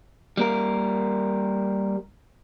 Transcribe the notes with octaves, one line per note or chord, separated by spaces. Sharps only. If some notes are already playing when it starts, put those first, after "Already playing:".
G3 A#3 A#4